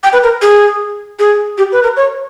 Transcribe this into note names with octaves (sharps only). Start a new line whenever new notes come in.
G5
B4
A#4
G#4
G#4
G4
B4
A#4
C#5